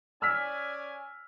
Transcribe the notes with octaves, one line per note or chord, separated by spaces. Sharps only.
C#4 D5 G#5 E6 F6 B6